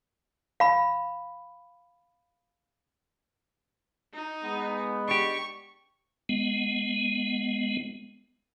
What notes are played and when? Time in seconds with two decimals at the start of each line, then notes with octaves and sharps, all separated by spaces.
0.60 F5 B5
4.14 D#4
4.44 G#3 B3
5.08 D4 G4 C#6
6.29 G#3 B3